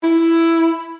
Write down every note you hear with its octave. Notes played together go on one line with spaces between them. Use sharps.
E4